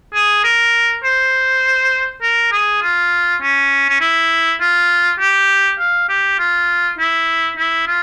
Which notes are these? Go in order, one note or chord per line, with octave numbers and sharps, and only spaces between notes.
G#4
A#4
C5
A#4
G#4
F4
C#4
C#4
E4
F4
G4
F5
G4
F4
E4
E4
F4